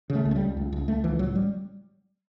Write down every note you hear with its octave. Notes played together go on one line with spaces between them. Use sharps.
C#3
A3
C#2
A3
G3
C#2
C#2
C#2
C#2 A3
C#2 E3
A1 F#3
G3